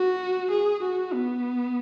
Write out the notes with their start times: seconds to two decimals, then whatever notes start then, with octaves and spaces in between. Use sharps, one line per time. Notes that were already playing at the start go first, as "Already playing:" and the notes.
Already playing: F#4
0.51 G#4
0.83 F#4
1.14 B3